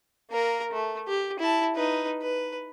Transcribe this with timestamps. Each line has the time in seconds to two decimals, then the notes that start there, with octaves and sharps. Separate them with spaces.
0.31 A#3 A#4
0.72 A3
1.08 G4
1.39 E4 A5
1.75 D#4 B4
2.22 B4